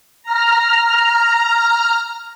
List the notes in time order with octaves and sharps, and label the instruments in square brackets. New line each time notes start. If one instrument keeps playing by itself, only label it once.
[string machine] A#5 F6